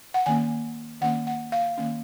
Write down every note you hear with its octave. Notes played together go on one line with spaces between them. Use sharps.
F#5
D#3 A#3 C#4 G#5
D#3 A#3 C#4 F#5
F#5
F5
D#3 A#3 C#4